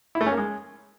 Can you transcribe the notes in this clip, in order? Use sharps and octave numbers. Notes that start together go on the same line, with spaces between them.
E4
A3
C#4
A#3
G#3